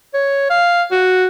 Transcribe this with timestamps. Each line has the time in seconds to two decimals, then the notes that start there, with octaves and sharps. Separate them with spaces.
0.14 C#5
0.50 F5
0.91 F#4